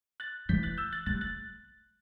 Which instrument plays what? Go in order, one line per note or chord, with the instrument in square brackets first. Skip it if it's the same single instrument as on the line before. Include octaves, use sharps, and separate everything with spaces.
[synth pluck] F#6 A6
[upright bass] E3 [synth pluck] G6 B6
[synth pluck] F#6 A6
E6 G6
F#6 A6
[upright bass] G3 [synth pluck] F#6 A6
[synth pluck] F#6 A6